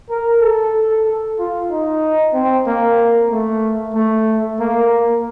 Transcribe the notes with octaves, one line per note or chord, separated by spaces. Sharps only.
A#4
A4
F4
D#4
C4
A#3
A3
A3
A#3